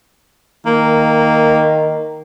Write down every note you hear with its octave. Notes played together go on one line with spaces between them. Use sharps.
D#3 A#3